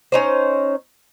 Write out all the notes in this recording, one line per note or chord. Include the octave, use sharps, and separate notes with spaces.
C#4 D#4 C5